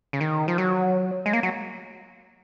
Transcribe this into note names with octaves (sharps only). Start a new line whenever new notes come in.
C#3
D#3
F3
F#3
G#3
A#3
F#3